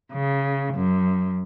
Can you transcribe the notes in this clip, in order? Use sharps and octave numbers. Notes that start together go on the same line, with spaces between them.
C#3
F#2